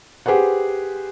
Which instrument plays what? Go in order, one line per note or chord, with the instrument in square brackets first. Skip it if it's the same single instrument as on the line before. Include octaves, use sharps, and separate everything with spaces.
[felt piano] G4 G#4 B4 C5 F#5